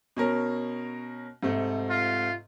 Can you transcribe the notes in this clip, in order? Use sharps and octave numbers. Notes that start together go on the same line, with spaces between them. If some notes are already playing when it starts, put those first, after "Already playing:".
B2 C#4 A#4
G#2 C3 A3
F4